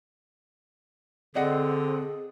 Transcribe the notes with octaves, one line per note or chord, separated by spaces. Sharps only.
D3 C4 G#4 D5 D#5 F#5